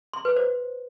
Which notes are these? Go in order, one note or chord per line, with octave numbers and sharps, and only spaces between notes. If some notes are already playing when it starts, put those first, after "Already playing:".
C6
B4
C5